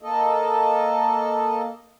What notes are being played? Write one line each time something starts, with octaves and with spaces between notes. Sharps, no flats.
A#3 A4 D#5